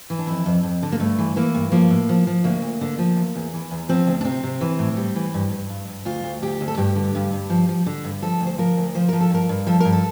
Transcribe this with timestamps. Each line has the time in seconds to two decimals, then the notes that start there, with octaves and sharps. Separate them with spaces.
0.10 E3
0.19 D4
0.27 F2 E4
0.46 F2
0.63 F2
0.83 D3
0.92 A#3
0.99 G2 A3
1.19 E3
1.36 E3 A#3
1.54 G2
1.72 F3 A#3
1.90 A2
2.09 F3
2.27 F3
2.44 D2 A#3
2.62 D2
2.81 D3
2.98 F3
3.16 E2
3.36 E2
3.54 E3
3.71 E2
3.89 F3 C4
4.07 D2
4.21 D4
4.25 C3 C4
4.44 C3
4.61 E3
4.79 A2
4.97 G3
5.16 E3
5.34 G2
5.51 G2
5.69 G2
5.88 G2
6.05 D2 F4
6.23 D2
6.42 D2 G4
6.61 D2
6.68 A4
6.77 G2 G4
6.96 D3
7.15 G2
7.33 G2
7.50 F3
7.69 F3
7.86 D3
8.04 G2
8.22 F3 A4
8.40 D2
8.47 C5
8.58 F3 A#4
8.77 D2
8.95 F3 C5
9.09 F3 A#4
9.21 A4
9.30 G2 A#4
9.49 G2
9.67 F3 A4
9.80 G2 A#4
9.93 A4